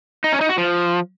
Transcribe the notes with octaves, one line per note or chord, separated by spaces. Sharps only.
D#4
C#4
D#4
F#4
F3